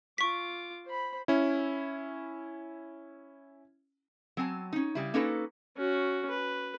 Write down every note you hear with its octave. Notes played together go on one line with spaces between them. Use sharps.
F4 C#6 D6 B6
C5 B5
C#4 E4
F#3 C4 G#5 A5
C#4 D#4
C#3 G3 E4
A#3 C#4 D#4 F#4 A4 B4
C#4 F#4
B4